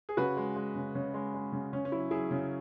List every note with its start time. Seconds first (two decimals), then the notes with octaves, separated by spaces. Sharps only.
0.09 G#4
0.17 C#3 F#4 B4
0.37 G#3
0.56 G#3
0.75 C#3
0.94 C#3 C#4
1.14 G#3
1.34 G#3
1.52 C#3
1.73 C#3 C#4
1.85 C#4
1.92 F#3 E4
2.11 F#3 E4 G#4
2.31 C#3